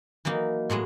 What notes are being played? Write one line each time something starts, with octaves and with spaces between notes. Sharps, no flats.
E3 F#3 A#3 D#4
A2 F#3 G#3 E4